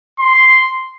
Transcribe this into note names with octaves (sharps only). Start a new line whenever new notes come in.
C6